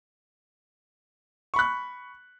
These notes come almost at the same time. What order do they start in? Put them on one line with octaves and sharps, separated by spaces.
C#6 B5 F#6